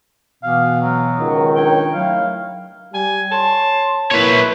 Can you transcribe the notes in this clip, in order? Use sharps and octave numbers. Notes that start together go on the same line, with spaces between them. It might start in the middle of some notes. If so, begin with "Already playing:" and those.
B2 E3 B3 F5
F#3
C#2 D#3
D4 D#4 C#5 G5
F#3 A3 E4 F5
G3 G#5
C#5 A5 C6
A#3 E4 B4 C#5